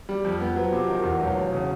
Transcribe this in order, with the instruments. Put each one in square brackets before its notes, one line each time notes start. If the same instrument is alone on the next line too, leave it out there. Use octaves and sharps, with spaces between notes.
[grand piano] G3
F2
B3
[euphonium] F3 [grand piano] F#3
[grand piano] C3
D#3
E2
[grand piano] E1 [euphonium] F#3
[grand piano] E1
C#3